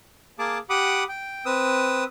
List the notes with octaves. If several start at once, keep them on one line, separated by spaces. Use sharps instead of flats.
A#3 G#4 A5 D6
G4 F#5 B5 D6 D#6
G5
C4 B4 D#6 E6